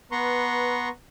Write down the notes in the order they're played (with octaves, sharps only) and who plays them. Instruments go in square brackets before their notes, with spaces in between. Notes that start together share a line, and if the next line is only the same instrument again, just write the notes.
[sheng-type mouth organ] B3 B4 A#5 C6 C#6